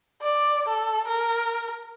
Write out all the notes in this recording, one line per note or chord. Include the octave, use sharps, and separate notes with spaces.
D5
A4
A#4